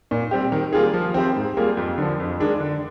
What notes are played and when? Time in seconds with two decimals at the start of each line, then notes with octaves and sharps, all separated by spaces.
0.11 A#2
0.31 G3 C4 G4
0.52 D#3
0.73 G3 A#3 F4 G#4
0.93 F3
1.14 C4 G4 C5
1.36 G#2
1.57 G3 A#3 F4 G#4
1.77 F2
1.98 D3 F3
2.20 F2
2.40 D#3 G#3 D4
2.60 D3